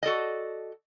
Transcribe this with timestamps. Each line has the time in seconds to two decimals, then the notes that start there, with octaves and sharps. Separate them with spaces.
0.03 F#4 A4 D5 D#5